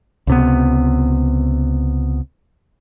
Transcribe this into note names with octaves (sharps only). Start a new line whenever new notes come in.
C#2 C3 B3